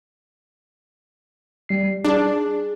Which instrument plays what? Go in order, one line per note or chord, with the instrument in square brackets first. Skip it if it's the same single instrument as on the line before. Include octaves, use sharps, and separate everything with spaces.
[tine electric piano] G3 C7
[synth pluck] D4 [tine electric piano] G#4